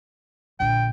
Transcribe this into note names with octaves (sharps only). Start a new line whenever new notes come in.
A#1 D3 G5